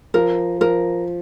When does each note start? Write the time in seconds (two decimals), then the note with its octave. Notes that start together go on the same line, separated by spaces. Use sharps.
0.14 F3 A#4
0.61 F3 A#4